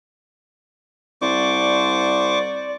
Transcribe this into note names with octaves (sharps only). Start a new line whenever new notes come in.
C2 C5 D5 C#6 D6